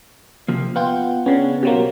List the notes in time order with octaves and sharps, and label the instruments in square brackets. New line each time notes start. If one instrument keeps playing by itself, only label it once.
[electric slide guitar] C3 F3 A#3
[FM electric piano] B3 F4 [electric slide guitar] F#5 G5
[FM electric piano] C#3 B3 [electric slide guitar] C#4 D4
[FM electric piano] B2 F#3 A#3 [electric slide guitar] G4 C5